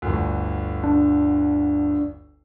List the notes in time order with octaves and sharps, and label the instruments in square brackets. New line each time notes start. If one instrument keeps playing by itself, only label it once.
[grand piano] G1 D2
[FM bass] D4